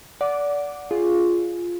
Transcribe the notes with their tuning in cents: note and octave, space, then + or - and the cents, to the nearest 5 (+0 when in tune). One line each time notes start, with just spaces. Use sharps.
D5 -20 F#5 -5 D6 +0
F4 +0 G#4 +0